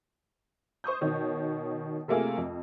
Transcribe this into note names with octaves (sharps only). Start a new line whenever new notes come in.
C5 C#6 D#6 G6
B2 D#3 C#5
C3 A3 A#3 F4 G#4
F2